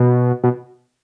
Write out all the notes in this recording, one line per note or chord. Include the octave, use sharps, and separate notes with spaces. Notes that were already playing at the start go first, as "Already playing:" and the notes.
Already playing: B2
B2